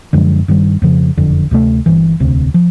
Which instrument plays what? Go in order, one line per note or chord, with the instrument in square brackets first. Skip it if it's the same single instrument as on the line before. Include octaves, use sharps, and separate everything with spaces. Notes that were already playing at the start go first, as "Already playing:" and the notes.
[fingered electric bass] F#2 D3 F3 G#3
G2 D#3 G3
F2 C#3 F3
F#1 F2 D3
D2 C3 F3 A3
G1 G2 E3
E1 D2 C3
F3